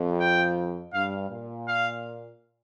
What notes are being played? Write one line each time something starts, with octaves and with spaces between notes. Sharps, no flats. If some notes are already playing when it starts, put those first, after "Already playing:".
Already playing: F2
G5
G2 F5
A#2
F5